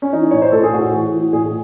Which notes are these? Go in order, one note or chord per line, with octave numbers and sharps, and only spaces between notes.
C#4
E3 D#4
A2 C#5
C5
A2 A4
G#4
A2 F#4
E3
E3
A2 G#4